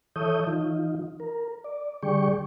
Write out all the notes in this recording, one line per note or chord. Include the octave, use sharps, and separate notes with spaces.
E3 A4 C#5 E5 D#6 G6
E3 D#4 F4
A#4
D5
D3 G3 G#4 D5 G5 C#6